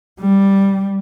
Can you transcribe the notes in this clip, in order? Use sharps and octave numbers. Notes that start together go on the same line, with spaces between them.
G3